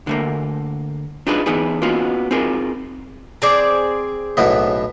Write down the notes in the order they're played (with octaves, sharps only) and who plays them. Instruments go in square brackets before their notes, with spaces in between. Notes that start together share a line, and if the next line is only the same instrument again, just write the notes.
[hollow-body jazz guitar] D3 A3 A#3
D4 D#4 F4 G#4 B4
E3 B3 D#4 G#4 B4
A#3 B3 C#4 D#4 F4 F#4
C4 D#4 F4 G#4 A#4
[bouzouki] C4 G#4 D5
[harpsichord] B1 A2 B3